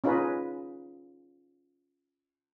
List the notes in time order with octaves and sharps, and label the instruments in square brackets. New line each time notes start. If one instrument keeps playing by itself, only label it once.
[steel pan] C#4 D#4 F4 G#4 B4